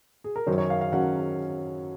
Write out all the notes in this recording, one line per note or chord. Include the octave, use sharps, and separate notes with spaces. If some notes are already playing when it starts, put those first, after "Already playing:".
G#4
A#4
F#2 D#3 F#3 C#4 C5
C#5
F5
F5
D#3 F#3 C#4 F#5